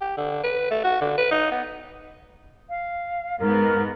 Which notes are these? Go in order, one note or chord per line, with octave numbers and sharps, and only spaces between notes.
G4
D3
B4
A3
F#4
D3
B4
D#4
B3
F5
G#2 B3 A#4